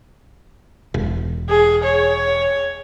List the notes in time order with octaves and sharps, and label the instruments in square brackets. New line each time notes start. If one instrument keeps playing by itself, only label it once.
[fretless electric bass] E1
[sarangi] G#4
C#5